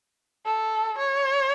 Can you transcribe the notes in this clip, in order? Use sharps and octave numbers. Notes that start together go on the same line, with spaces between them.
A4
C#5